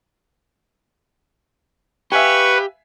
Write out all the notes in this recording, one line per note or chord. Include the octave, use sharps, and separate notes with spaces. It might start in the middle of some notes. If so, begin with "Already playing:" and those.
G4 B4 E5 F5 G#5 C#6